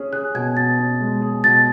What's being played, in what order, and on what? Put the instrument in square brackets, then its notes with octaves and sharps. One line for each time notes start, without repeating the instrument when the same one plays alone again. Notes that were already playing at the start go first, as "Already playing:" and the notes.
Already playing: [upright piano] C#4 G#4
[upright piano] G#4 [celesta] F#6
[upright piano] B2 [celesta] G#6
[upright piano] B2 [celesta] A6
[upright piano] C#4
G#3
G#4
[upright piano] B2 [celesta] A6